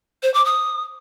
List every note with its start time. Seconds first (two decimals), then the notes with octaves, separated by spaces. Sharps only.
0.23 C5
0.34 D6
0.45 D#6